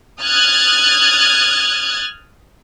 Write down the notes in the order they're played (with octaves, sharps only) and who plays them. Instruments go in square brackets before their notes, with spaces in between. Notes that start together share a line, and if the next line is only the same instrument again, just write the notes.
[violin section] D#6 F6 F#6 G#6 A6